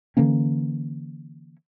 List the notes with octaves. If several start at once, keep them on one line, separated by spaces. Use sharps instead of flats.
D3 E3 A#3 C#4